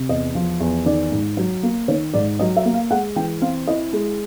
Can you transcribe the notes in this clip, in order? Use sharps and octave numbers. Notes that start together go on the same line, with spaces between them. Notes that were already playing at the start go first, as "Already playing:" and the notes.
Already playing: C3
E2 D#5
F3
E2
D#3 D5
G#2
F#3
A#3
D#3 C#5
G#2 D5
F#3 D#5
E5
A#3
F5
G#3 F#5
E3 G5
C4 F5
E4 D#5
G#3